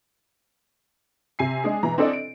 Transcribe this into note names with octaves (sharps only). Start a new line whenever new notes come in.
C3 G#5 C7
G#3 D4 G#4
B2 E3 A#5
C4 D4 E4 A4 D5 D#5
D7